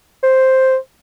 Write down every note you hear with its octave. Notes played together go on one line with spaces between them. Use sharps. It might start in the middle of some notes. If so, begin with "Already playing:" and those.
C5